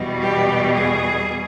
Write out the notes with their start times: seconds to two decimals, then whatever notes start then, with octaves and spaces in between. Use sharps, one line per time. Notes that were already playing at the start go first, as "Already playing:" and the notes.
Already playing: E2 B2 G3
0.20 G4
0.72 G#4